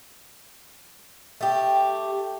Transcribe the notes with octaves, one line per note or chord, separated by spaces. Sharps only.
A3 G4